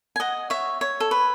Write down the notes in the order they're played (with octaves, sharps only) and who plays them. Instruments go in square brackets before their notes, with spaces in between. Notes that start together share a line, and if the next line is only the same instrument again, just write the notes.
[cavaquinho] G#5
D#5 F#5
C#5 E5
C#5
A4
B4